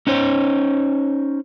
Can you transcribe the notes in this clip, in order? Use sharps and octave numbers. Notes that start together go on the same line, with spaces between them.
C#4 D#4 C5 C#5